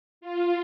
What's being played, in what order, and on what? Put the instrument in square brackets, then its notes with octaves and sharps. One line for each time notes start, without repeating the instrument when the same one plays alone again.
[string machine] F4